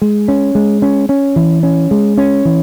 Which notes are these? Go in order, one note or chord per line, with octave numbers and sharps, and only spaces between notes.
G#3
C#4
G#3
C#4
C#4
E3
C#4
G#3
C#4
E3